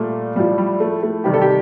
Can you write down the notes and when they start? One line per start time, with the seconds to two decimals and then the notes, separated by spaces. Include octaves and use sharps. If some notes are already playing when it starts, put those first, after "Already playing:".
Already playing: A#2 G3 A3
0.36 A2 F3 G3
0.58 G3
0.80 A3
1.03 A3
1.24 C3 D#3 G3 G4
1.34 A4
1.42 G4